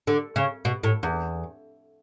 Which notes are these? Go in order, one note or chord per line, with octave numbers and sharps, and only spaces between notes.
D3
C#3
B2
A2
E2